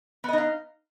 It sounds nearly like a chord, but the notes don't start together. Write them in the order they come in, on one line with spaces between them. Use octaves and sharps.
B3 D#5 D#4 F5